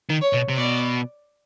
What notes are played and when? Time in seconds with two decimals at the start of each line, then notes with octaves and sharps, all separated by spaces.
0.09 D#3
0.21 C#5
0.33 B2
0.48 C3
0.57 B2 D5